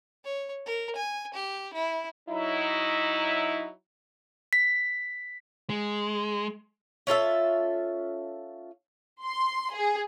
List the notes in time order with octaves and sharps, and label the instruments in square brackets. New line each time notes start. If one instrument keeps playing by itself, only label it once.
[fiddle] C#5
A#4
G#5
G4
E4
[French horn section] F#3 D#4 E4
[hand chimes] B6
[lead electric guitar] G#3
[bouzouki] C#4 F4 A4 E5
[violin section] C6
G#4